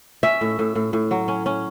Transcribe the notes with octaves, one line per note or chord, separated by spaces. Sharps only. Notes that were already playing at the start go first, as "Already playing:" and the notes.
C#4 E5
A2
A2
A2
A2
F#3
C#4
C#4